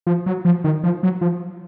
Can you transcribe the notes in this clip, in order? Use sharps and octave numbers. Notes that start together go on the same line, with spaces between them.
F3
F#3
F3
D#3
F3
F#3
F3